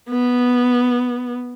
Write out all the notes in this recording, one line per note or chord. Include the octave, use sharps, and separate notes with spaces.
B3